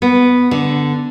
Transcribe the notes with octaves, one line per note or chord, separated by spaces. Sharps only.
B3
D3